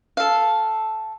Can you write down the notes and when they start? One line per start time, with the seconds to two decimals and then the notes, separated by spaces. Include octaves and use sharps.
0.17 A4 F5